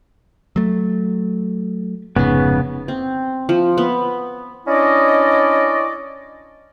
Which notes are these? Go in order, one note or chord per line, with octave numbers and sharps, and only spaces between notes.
F#3 A3
F1 G#2 C#3 B3
C4
F3
B3
C#4 D4 E4 D5 D#5